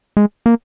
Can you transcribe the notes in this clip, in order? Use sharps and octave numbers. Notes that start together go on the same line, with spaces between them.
G#3
A#3